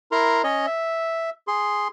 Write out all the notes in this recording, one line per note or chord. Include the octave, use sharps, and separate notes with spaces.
E4 A#4 A#5 C6
C#4 C#5 D#5
E5
G#4 C6